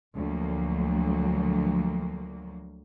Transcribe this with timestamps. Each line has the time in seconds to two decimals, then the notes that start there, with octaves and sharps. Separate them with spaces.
0.15 D2 F3 F#3 A#3